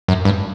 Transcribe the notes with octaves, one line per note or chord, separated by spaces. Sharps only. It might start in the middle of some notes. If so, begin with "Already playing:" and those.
F#2
G2